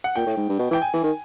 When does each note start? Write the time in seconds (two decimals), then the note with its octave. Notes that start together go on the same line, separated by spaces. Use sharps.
0.04 F#5
0.16 A#2 G5
0.26 A2
0.37 G#2
0.49 G2
0.59 B2
0.71 E3 G5
0.82 G#5
0.94 E3
1.04 D#3